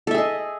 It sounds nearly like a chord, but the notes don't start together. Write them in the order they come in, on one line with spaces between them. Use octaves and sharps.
A4 E5 G#4 D#5